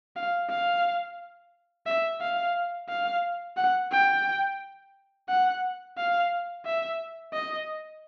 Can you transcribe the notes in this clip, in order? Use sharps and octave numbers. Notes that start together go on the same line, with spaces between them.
F5
F5
E5
F5
F5
F#5
G5
F#5
F5
E5
D#5